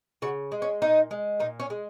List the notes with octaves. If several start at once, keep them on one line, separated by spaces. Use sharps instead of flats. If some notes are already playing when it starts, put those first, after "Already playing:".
C#3 F#4
G#3
C#4
A#2 D#4
G#3
A#2 D#4
C#4
G#3